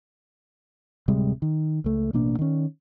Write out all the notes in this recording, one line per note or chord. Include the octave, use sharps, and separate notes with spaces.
D1 C3 G3 G#3
D#3
C#2 A3
A1 B2 A#3 D4
D#3 C#4